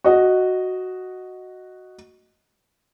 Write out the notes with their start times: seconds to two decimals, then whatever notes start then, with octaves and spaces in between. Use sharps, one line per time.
0.04 F#4 D#5